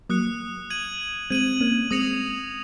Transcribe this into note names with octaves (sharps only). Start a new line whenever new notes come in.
F#3 A#3 D#6 F#6 C#7
G#6 D#7 F#7
G#3 C4 G#6 D#7 F#7
A#3 C#4
G#3 C4 D#6 A#6 C#7 F7